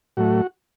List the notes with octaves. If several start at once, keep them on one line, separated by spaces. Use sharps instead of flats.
A2 F#3 A3 F#4